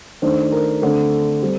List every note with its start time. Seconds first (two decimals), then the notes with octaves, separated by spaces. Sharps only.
0.22 D#3 A3 D4 C5
0.52 A#4
0.82 D3 A3 C4 A4
1.42 G3 C4